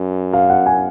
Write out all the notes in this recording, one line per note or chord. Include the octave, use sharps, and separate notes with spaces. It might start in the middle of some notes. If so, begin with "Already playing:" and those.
Already playing: F#2
F5
F#5
G#5